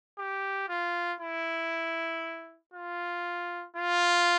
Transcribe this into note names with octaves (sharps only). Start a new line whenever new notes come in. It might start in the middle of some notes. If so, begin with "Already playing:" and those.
G4
F4
E4
F4
F4